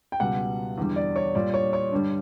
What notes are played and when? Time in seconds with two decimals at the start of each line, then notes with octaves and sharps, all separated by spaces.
0.12 G5
0.20 C#2 B2 G3 F#5
0.78 E2 D3 G3
0.96 D5
1.16 C#5
1.35 A#2 G3 D5
1.54 C#5
1.73 C#5
1.92 G2 D3 G3